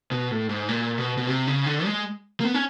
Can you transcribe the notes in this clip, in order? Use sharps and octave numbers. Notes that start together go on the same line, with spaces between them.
B2
A2
G#2
A#2
B2
B2
C3
C#3
D3
G#3
A#3
B3
C#4